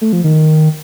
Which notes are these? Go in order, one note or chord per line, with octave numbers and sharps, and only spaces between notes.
A3
F3
D#3